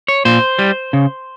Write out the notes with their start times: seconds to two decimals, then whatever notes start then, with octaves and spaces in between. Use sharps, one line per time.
0.08 C#5
0.25 A#2 C5
0.59 G3
0.93 C#3